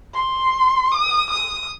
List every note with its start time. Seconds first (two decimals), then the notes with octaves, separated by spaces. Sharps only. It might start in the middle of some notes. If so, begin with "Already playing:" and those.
0.14 C6
0.92 D#6
1.30 D#6